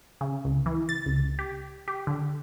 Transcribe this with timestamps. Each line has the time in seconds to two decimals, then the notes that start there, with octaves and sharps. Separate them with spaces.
0.21 C#3
0.45 C#2
0.66 E3
0.89 A6
1.06 C#2
1.39 G4
1.88 G4
2.07 D3